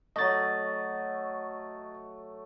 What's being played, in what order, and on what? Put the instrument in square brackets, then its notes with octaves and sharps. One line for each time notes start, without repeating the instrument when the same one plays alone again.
[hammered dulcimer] F#3 A3 [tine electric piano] D#5 A6